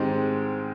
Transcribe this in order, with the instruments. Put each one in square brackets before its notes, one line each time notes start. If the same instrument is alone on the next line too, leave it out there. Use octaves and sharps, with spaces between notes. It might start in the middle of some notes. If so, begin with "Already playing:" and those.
Already playing: [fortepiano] G#2 D#3 G#3 C4 G4